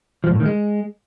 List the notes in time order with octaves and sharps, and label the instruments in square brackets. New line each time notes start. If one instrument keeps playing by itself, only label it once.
[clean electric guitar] F3
G#2
A2
D#3
G#3